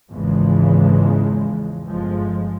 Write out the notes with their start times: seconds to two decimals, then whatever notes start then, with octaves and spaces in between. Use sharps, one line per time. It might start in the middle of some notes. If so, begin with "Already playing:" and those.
0.11 G#1 E2 C#3 F3 G#3
1.87 G1 F3 G#3